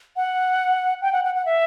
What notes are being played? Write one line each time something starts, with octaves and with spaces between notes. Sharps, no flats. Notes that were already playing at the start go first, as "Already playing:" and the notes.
F#5
G5
F#5
F#5
F#5
E5